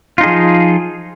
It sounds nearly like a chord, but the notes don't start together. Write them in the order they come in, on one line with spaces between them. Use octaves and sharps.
F4 D#4 G#4 F3